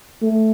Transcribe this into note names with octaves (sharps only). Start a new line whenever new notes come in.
A3